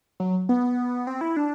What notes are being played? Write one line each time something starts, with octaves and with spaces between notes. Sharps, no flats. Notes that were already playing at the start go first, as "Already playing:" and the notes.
F#3
B3
C4
E4
D4